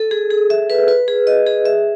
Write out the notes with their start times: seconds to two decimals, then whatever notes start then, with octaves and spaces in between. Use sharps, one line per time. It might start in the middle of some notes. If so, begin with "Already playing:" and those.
Already playing: A4
0.11 G#4
0.31 G#4
0.50 E5
0.70 B4
0.88 B4
1.08 G#4
1.27 D#5
1.46 G#4
1.65 E5